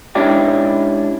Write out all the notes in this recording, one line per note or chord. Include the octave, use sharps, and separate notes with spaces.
G#2 C#4 D4 E4 G4